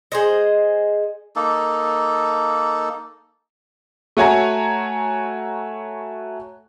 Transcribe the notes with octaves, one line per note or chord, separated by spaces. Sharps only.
G#4 C5 D#5
A#3 D#4 A4
A3 F#4 C#5 G#5 A#5